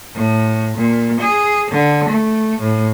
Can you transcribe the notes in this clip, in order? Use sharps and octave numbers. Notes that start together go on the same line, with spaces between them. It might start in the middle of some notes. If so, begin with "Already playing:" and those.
A2
A#2
G#4
D3
A3
A2